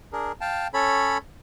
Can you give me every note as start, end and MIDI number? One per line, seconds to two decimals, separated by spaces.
0.13 0.32 62
0.13 0.32 68
0.13 0.32 70
0.41 0.67 77
0.41 0.67 79
0.41 0.67 81
0.74 1.18 61
0.74 1.18 69
0.74 1.18 73
0.74 1.18 83